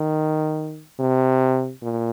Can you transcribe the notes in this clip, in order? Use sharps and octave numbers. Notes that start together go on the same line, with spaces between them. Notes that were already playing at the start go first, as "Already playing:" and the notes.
Already playing: D#3
C3
A#2